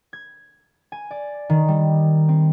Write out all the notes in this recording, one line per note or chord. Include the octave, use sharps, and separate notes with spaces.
G#6
G#5
D5
D#3
G3
C4